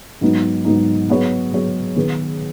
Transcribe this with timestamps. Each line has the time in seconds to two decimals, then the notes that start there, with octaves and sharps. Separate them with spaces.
0.21 G#2 F#3 B3 D#4
0.65 G#2 F#3 B3 D#4
1.09 F#3 B3 G#4 C#5
1.53 F#3 B3 G#4 C#5
1.96 D#3 B3 G#4 B4